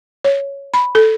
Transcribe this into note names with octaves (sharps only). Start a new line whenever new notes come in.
C#5
B5
A4